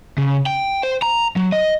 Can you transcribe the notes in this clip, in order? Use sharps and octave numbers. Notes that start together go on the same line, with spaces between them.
C#3
G5
C5
A#5
F#3
D#5